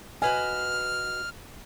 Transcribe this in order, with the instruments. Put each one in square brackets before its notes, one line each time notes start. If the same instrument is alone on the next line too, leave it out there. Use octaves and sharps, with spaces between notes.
[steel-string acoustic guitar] F#4 B4 D#5 [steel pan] G#5 [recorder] F6